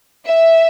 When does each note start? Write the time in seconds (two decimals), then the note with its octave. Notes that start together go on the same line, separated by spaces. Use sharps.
0.24 E5